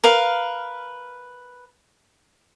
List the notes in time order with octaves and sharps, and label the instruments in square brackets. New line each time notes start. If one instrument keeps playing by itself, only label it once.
[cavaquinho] A#4 B4 F5